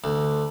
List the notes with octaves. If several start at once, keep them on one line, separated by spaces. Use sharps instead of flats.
D2